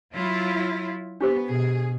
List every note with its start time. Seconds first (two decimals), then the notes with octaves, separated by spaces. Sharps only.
0.14 F#3 E4 F4
1.21 B3 D4 G4 C5
1.49 B2 G#4